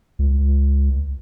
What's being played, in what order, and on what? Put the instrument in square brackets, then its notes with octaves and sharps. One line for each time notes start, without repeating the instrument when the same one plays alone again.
[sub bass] C#2